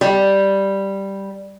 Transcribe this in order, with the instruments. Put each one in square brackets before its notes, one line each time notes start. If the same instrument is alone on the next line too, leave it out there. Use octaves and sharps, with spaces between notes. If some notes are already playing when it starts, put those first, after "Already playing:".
[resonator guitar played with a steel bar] G3